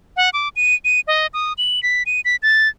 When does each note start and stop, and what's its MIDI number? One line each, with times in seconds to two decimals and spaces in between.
0.17 0.29 78
0.33 0.49 86
0.56 0.75 99
0.85 1.00 99
1.07 1.27 75
1.34 1.53 87
1.58 1.82 102
1.83 2.03 95
2.06 2.21 99
2.25 2.36 95
2.43 2.68 93